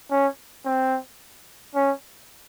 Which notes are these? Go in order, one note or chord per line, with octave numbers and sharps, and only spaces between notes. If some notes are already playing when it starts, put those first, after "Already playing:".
C#4
C4
C#4